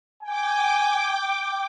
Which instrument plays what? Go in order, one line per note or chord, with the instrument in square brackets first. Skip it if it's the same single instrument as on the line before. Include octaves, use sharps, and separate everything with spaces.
[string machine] G5 D6 [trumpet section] G#5